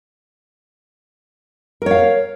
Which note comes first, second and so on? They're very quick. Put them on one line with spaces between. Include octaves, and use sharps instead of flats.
A#4 C#5 F5